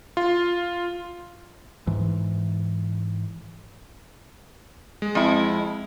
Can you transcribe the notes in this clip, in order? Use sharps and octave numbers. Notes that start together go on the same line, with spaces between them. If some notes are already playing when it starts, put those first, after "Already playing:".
F4
G#2 E3
G#3
F2 E4